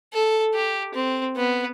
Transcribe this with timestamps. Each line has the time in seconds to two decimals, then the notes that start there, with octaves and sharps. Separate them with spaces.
0.13 A4
0.54 G4
0.95 C4
1.36 B3